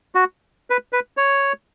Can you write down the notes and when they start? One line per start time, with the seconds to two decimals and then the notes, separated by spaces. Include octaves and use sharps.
0.15 F#4
0.70 B4
0.93 B4
1.17 C#5